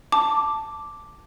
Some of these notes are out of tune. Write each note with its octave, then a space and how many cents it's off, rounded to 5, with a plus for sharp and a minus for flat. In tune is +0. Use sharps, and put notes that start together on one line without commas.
A5 +0 D6 +0